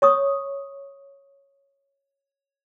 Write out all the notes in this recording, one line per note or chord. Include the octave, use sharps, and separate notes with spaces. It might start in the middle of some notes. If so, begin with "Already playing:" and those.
C#5 C#6 D#6